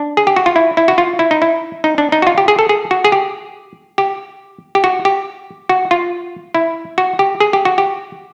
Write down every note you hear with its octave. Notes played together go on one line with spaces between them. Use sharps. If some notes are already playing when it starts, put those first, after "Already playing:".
Already playing: D4
G#4
G4
F#4
F4
E4
E4
F#4
F4
E4
D#4
E4
D#4
D4
D#4
F#4
F4
G4
G#4
A4
G#4
F#4
G#4
G4
G4
G4
F#4
G4
F#4
F4
E4
F#4
G4
G#4
G4
F#4
G4